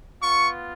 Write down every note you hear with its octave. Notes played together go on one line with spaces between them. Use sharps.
B3 F4 C#6